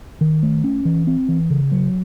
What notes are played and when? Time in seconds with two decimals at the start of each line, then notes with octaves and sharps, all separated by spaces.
0.21 D#3
0.43 A3
0.64 C#4
0.85 E3
1.07 C4
1.29 E3
1.50 C#3
1.72 F#3